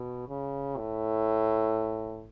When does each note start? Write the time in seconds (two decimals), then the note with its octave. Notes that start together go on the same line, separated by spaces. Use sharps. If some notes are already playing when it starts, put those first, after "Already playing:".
Already playing: B2
0.29 C#3
0.77 A2